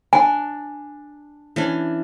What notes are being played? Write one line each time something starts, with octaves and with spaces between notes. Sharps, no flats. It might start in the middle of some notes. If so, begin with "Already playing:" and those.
D4 G#5
E3 C#4 D4